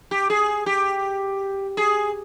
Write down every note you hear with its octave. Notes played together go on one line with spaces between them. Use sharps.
G4
G#4
G4
G#4